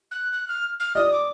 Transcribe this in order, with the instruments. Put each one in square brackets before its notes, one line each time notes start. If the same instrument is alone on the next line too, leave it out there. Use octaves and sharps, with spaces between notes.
[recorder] F#6
F#6
F6
F6
[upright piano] D5 [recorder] D#6
[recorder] D6